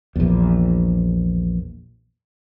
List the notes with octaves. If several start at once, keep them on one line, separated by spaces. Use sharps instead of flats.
A#1 E2